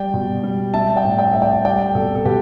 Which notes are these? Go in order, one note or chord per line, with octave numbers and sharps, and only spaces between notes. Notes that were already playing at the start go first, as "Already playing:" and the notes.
Already playing: G3 D5 G5
B2
G3
G3 E5 A5
D5 G5
A2
D5 G5
A2 E5
D5 G5
G3 D5 G5
B2 A4
A4
B2 G4 B4